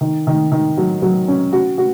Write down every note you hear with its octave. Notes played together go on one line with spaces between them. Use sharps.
D#3
D#3
D#3
F#3
F#3
C#4
F#4
F#4